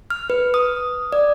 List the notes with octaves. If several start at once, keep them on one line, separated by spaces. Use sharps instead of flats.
F6
B4
D#6
D5